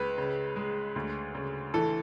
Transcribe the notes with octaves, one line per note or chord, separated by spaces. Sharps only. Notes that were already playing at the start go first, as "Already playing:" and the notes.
Already playing: C#2 B4
C#3
G#3
D2
C#3
E3 A4